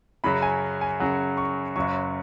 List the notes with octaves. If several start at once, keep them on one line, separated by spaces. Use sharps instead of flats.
F#2 C#3 F#3 B5
G#5
G#5
F#2 C#3 F#3 F#5
C#6
F#1 F#2 F#3 C#6